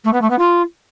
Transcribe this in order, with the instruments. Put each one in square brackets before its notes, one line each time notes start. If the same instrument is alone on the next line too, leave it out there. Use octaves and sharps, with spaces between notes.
[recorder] A3
B3
A3
B3
F4